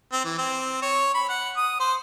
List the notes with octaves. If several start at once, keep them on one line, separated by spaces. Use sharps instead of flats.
C4
E3
C4
C#5
B5
F#5
D#6
C5